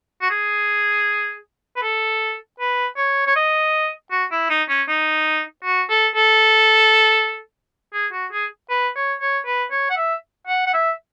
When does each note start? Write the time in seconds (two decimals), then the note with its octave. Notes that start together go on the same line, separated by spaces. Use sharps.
0.22 F#4
0.30 G#4
1.76 B4
1.82 A4
2.60 B4
2.97 C#5
3.27 C#5
3.36 D#5
4.11 F#4
4.32 E4
4.50 D#4
4.69 C#4
4.88 D#4
5.64 F#4
5.90 A4
6.15 A4
7.94 G#4
8.13 F#4
8.32 G#4
8.70 B4
8.96 C#5
9.21 C#5
9.46 B4
9.71 C#5
9.90 F#5
9.97 E5
10.48 F#5
10.67 F#5
10.74 E5